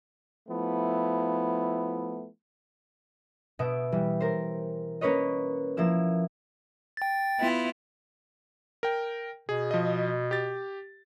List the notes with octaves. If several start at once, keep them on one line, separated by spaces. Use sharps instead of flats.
F3 A3 B3 E4
B2 B3 E5 D7
E3 G3
A#4 C5
A#3 C#4 B4 C#5 D#5
F3 A#3 E4 E6
G5 A6
B3 E4 F4
A#4 G5
B2 G#4
F3 D#5
G4 A6